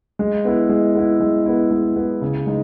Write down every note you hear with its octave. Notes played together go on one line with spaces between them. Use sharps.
G#3
B3 E4
G#3
B3 E4
G#3
B3 E4
G#3
B3 E4
C#3
G#3 D#4